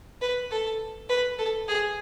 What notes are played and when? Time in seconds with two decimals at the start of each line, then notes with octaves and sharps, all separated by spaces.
0.21 B4
0.51 A4
1.09 B4
1.39 A4
1.68 G#4